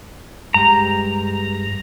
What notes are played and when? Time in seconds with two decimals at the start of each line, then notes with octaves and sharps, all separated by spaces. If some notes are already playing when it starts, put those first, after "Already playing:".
0.54 G2 G#3 G4 A#5